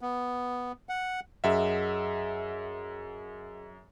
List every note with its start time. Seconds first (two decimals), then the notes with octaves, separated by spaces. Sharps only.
0.01 B3
0.89 F#5
1.44 F#2 G#4 D#5 E5 F#5